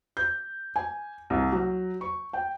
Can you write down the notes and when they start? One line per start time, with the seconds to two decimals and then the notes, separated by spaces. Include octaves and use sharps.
0.17 G6
0.76 G#5
1.30 C2
1.52 F#3
2.01 C#6
2.33 G5